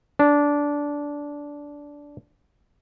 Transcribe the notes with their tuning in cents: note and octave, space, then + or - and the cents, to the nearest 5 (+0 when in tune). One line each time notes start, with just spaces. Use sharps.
D4 -15